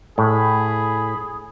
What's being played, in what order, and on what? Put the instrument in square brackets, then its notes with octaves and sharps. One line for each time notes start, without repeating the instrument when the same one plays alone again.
[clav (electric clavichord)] A2 [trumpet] G#4 [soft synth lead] B5